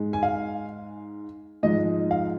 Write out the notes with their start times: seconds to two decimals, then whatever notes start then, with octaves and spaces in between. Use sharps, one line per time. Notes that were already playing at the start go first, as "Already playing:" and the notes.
Already playing: G#2 G#3
0.13 G#5
0.23 F5
1.63 G#2 F3 G#3 D#5
2.11 F5